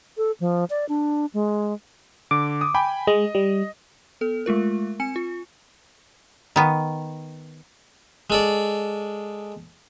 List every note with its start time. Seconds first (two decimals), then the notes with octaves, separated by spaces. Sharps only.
0.17 A4
0.40 F3
0.70 D5
0.89 D4
1.34 G#3
2.31 D3 D6
2.61 D#6
2.75 G5 G#5 B5
3.07 G#3 D#5
3.35 G3
4.21 B3 A4
4.46 G#3 A3 F4 A#4
5.00 C4 G#5 C#7
5.16 F4
6.56 D#3 B3
8.30 G#3 A4 D5